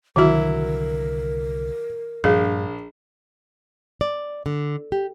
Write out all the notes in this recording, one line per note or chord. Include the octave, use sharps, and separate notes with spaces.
C2 D3 D#3 F#3 E4 F#4 A#4
A#1 G2 G#4 F5
D5
D3
G4